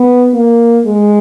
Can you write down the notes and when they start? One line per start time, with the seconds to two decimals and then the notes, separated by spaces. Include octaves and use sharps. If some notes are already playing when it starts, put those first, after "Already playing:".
Already playing: B3
0.34 A#3
0.86 G#3